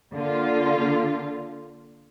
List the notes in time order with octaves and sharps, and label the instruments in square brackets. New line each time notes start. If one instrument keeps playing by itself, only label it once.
[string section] D3 A#3 F4